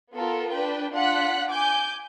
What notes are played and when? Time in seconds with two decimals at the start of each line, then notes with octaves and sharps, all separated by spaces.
0.15 B3 F4 A4 A#4
0.54 D4 B4 G5
0.94 D4 F4 F#5 F#6 B6
1.50 G#5 D6 G6